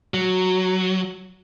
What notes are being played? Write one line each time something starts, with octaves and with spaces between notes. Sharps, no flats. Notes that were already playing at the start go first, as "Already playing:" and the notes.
F#3